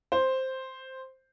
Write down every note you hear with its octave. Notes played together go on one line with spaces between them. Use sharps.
C5